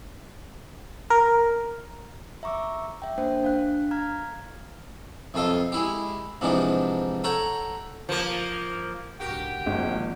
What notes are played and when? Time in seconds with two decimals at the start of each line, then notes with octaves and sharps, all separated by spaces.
1.10 A#4
2.43 E5 A#5 C#6 D6 E6
3.02 E5 G5
3.18 A#3 D4 C5 G5
3.43 D4 F5 F#6
3.91 F5 A#5 F6 G#6
5.34 B1 F2 F4 A4 D#5
5.72 G#3 E4 G4
6.41 G#2 C3 E3 F3 D4 D#4
7.24 A4 C#5 F#5 G5 A#5
8.09 F3 A#3
9.20 C2 G#2 D3 F#4 G4 A#4 G5
9.66 G#1 D#3 F3 A#3